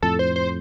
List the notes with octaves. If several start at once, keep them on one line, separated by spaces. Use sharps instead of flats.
F2 A2 A4
C5
C5